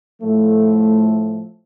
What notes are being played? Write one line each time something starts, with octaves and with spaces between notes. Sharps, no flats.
A2 F3 A3